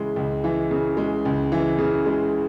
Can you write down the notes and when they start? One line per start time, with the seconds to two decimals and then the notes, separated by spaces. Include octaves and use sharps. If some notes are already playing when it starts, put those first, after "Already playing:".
Already playing: C#2 C#3 E3 G#3
0.16 C#2
0.44 E3
0.71 C#3
0.97 G#3
1.25 C#2
1.52 E3
1.78 C#3
2.06 G#3